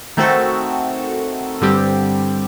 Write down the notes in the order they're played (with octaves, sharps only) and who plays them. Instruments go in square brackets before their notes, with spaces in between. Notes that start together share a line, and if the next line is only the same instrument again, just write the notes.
[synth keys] D#3 A3 C4 F#4 A4
G2 D3 G3 C4 G4